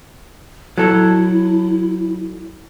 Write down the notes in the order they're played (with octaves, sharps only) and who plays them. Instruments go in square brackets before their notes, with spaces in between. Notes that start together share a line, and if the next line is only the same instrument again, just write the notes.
[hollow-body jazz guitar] F#3 A4 [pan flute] E4